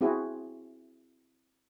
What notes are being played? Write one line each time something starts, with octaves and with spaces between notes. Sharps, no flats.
C4 E4 F#4 G#4